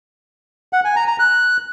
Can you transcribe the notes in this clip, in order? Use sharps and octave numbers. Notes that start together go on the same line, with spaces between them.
F#5
G#5
A#5
A#5
F#6